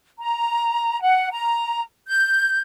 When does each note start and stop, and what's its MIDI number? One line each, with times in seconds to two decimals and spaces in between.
0.19 1.01 82
1.01 1.28 78
1.32 1.82 82
2.08 2.59 91